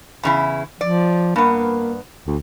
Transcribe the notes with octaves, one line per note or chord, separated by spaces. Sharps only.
E2 C#3 E4
F3 D5
G2 A#3 B3
D2